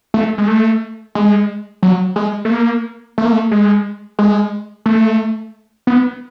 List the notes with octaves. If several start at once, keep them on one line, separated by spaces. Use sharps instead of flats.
A3
G#3
A3
G#3
F#3
G#3
A3
A#3
A3
A#3
A3
G#3
G#3
A3
B3